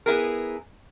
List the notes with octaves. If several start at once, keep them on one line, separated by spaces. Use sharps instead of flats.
B3 E4 G#4 A#4